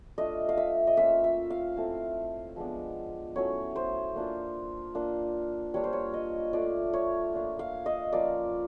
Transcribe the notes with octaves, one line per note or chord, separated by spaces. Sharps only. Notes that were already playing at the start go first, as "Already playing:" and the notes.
A3 D4 F4 D#5
F5
E5
D#5
A#3 C#4 F4 E5
E5
F5
A3 C4 E4
F3 G#3 B3 D4
F#3 A3 C#4 E4 C#5
C5
A#3 D4 F4
A#3 D4 F4
G3 A#3 D4 F4 C#5
C5
C#5
D#5
A3 D4 F4 D5
C#5
A#3 D4 F4
F5
D#5
F3 A#3 C#4 F4 D5